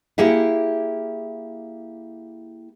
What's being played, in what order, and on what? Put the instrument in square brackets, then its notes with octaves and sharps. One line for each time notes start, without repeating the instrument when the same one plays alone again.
[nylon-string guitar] A#3 E4 G4 G#4 E5 F#5